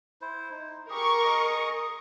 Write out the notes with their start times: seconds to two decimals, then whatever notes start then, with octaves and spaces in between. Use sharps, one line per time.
0.21 E4 C5
0.51 D#4
0.89 G4 G#4 A#4 C#6
1.25 G#4 D#5 D#6